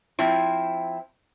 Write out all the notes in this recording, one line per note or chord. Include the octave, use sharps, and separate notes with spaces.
F3 C4 E4